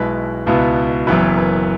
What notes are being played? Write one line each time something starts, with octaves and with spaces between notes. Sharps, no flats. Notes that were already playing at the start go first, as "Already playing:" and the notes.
Already playing: B1 B2 G#3 E4 B4
C#2 B2 B3 E4
F#1 F#2 E3 B3 E4 B4
B4